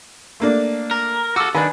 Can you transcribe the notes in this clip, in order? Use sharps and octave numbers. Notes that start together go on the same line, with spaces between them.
A3 A#3 D4
A#4
F#4 A4 D6 E6 F6
D#3 D4 B4 G#5